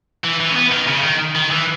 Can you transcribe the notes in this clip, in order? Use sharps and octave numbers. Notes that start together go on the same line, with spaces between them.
E3
E3
C#4
B3
D#3
C#3
D#3
D#3
E3